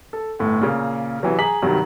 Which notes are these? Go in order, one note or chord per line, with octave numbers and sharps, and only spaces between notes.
A4
G1 A2
A#2 C#3
C3 E3 F#3
G#4 A#5 B6 F#7
G2 C3 D#3 F#3